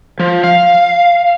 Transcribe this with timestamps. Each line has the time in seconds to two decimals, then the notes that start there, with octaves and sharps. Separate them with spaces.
0.20 F3
0.44 F5